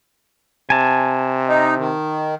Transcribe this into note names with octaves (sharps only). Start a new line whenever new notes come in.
C3 G#5 A5
D#4
D#3